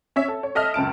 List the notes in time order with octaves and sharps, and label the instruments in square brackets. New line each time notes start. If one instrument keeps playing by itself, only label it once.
[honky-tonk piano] C#4 C#5 E5
A4
C#5
A4 D#5 E5 F6
C#2 F#2 A5 D7